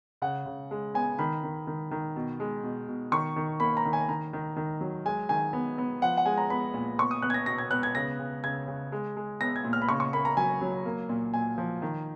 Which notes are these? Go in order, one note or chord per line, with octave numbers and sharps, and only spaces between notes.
C#3 F#5
C#3
G#3
B3 G#5
D#3 B5
D#3
D#3
D#3
B2
G#3
B2
B2
D#3 C#6
D#3
A#3 B5
A#5
D#3
G#5
D#3 A#5
D#3
D#3
F#3
G#3 G#5
D#3 G#5
B3
B3
F3 F#5
F#5
G#3 G#5
A#5
B3 B5
A#2
B3 C#6
D#6
B3 F#6
G#6
A#6
B2 A#6
G#6
B3 F#6
G#6
C#3 A#6
C#3
C#3 G#6
C#3
G#3
G#3
B3 A#6
G#6
A#2
F6
B5
C#3 C#6
C#6
A#3 B5
A#5
F#3 G#5
F#3
A#3
A#2
A#2 G#5
F3
D#3